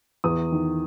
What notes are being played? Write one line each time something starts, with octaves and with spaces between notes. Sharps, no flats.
E2 D#6
D#3